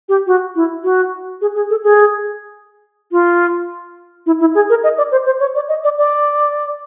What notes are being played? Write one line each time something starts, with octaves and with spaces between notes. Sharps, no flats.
G4
F#4
E4
F#4
G#4
G#4
A4
G#4
F4
E4
E4
G#4
A#4
D#5
D5
C5
C5
C#5
D5
D#5
D5
D5